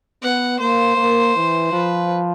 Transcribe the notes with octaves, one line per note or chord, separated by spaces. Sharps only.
B3 F#5
A#3 C5
A#3
E3
F3 B4